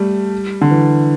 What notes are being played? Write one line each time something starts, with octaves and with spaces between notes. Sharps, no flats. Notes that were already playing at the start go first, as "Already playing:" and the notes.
Already playing: G3 A3
D3
E3